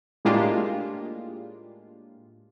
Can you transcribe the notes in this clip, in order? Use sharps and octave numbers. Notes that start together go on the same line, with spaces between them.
A2 G#3 A#3 D4 F4 G4